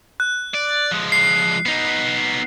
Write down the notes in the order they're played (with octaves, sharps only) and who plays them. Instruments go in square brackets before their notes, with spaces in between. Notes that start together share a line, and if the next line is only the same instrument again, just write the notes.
[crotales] F#6
[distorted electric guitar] D5
F3 G#3
[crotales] C7
[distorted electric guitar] B3 D#4